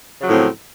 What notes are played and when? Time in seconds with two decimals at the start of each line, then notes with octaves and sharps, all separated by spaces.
0.20 C#3
0.23 F#3
0.26 F3
0.29 A2
0.33 C4